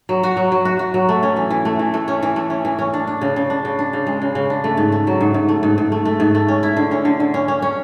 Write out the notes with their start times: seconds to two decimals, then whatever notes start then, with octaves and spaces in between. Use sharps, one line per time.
0.09 F#3
0.23 F#4
0.37 F#3
0.52 F#3
0.65 F#4
0.79 F#4
0.94 F#3
1.09 A3
1.23 C#4
1.36 E3
1.50 E3
1.65 A3
1.79 E3
1.94 A3
2.08 C#4
2.23 E3
2.36 A3
2.50 C#4
2.65 E3
2.79 C#4
2.94 D4
3.07 D4
3.21 C#3
3.36 C#3
3.50 D4
3.65 C#3
3.79 D4
3.93 C#3
4.07 G#3
4.22 C#3
4.35 C#3
4.50 D4
4.64 A3
4.77 G#2
4.92 A3
5.07 F#3
5.21 G#2
5.34 G#2
5.49 A3
5.63 G#2
5.78 G#2
5.92 A3
6.05 A3
6.20 G#2
6.35 A3
6.48 C#4
6.63 E4
6.77 D3
6.91 C#4
7.05 D3
7.20 D3
7.34 C#4
7.48 C#4
7.62 C#4